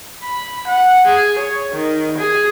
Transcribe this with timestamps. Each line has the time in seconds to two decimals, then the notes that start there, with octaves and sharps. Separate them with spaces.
0.23 B5
0.68 F#5
1.06 G#4
1.39 C#5
1.72 D#3
2.18 G#4